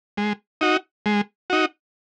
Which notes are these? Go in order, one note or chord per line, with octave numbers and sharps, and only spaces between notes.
G#3
D#4 F#4
G#3
D#4 F#4